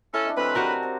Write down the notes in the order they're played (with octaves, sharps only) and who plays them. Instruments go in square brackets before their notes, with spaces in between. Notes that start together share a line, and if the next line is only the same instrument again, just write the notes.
[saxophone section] C#4 A4 [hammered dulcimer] E4
[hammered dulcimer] D4 D#5
[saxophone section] D2 F#3 B4 [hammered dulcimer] E3 C4
[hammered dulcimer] D4 [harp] F#4 G4 A#4
[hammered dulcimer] C5 A5